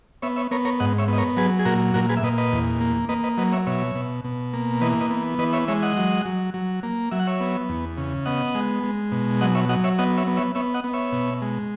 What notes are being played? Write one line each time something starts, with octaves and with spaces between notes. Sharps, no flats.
B3 C#5 E5
C#5 E5
B3 A#4 C#5
A#4 C#5
G#2 D#5 F#5
C#5 E5
B3 D#5
A#4 C#5
F#3 G#4 B4
G#4
A#2 F#4 A#4
A#2 F#4 A#4
G#4 B4
E5
A#2 B4 D#5
B4 D#5
E2
A#3
A#3 B4 D#5
B4 D#5
F#3 B4 D#5
C#5 E5
B2 C#5 E5
B2
B2
A#3
E3 B4 D#5
B4 D#5
B3
E3 B4 D#5
C#5 E5
G#3 C#5 E5
D#5 F#5
F#3
F#3
F#3
A#3
F#3 E5
F#5
C#5 E5
B3
E2
C#3
B3 D#5 F#5
G#3
G#3
B2
F#3 D#5 F#5
C#5 E5
F#3 D#5 F#5
C#5 E5
B3 D#5 F#5
C#5 E5
B3
C#5 E5
B3 C#5 E5
D#5 F#5
B3
C#5 E5
B2
G#3